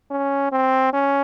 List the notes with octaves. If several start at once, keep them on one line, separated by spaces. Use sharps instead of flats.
C#4
C4
C#4